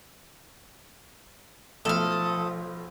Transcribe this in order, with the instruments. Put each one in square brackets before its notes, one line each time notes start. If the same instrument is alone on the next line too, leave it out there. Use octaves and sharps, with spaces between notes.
[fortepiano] B1 A3 [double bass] F3 [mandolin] A4 F6 [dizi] D#6